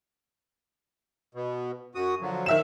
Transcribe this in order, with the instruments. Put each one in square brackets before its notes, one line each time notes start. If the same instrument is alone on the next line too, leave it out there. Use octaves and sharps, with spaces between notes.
[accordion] B2
F#2 F#4 D#6
D3 F3 F#3
[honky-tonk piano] D#3 E5 E7